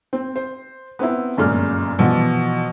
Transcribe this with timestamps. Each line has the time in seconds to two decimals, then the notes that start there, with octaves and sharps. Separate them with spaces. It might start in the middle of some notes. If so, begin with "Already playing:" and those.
0.13 C4
0.36 C5
0.99 B3 C4 E4
1.37 G1 F#2 A#2 G#3 F6
1.99 B2 E3 F3